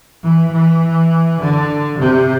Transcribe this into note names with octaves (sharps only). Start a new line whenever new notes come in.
E3
E3
D3
C3